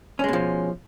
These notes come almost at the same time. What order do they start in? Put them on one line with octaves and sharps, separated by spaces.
C#4 G#3 B2 F3